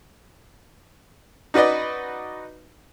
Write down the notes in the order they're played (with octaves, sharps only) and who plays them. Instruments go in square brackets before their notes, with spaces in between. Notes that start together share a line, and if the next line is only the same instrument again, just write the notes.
[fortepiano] D#4 F#4 B4 D5 D#5